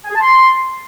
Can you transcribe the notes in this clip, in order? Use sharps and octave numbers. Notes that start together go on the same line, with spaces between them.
G#5
G#4
A5
C6